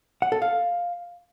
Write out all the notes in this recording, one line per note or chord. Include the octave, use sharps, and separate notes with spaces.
F#5
A4
F5